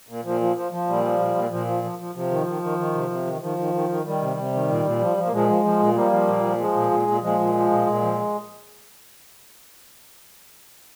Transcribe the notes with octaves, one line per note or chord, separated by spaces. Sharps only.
A#2
A#2 F3
F3
F3
F3
A#2 G3
F3
A#2
A#2
A#2 F3
F3
F3
F3
C3 F3
D#3
D#3
D#3
D#3
C3
C3
D#3
D#3 F3
D#3
D#3
D#3
D#3 G3
C3
C3
D#3
A#2
A#2
F3
F3
A#3
A#2 F3 G#3
F3
F3
A#2
F3 G3 A#3
F3
A#2
F3
F3 G#3
A#2
A#2
A#2
A#2 F3 G#3
A#2
F3
A#2
A#2
F3